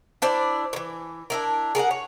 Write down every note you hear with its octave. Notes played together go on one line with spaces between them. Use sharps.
D4 E4 C5 D5
D#3 E3
D4 E4 A#4
G#4 A#4 E5 F#5
C#5